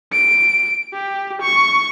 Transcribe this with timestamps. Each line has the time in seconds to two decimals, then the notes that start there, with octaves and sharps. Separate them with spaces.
0.12 D7
0.93 G4
1.42 C#6